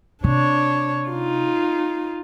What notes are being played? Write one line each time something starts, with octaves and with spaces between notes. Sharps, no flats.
C3 D4 C#5
D#4 F4